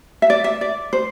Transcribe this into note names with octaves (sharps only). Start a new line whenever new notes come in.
E5
D5
E5
D5
C5